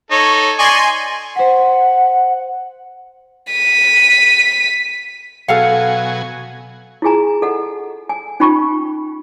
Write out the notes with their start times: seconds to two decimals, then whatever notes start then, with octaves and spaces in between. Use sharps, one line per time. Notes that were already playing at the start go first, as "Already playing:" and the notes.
0.11 D#4 A4 C#5
0.59 D5 D#5 G#5 C6 C#6
1.36 C5 F#5 B6
3.52 B6 D#7
5.48 B2 F#3 A4 F5 F#5 G#5
7.02 E4 F4 G#4 G#5 A#5
7.42 A4 D#5 F#5
8.09 G#5
8.40 C#4 D#4 F4 G5 B5 C#6